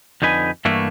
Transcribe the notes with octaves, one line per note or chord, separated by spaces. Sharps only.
F2 D3 D#4 B4 G#5
G2 E3 A3 A#3 E4 F#4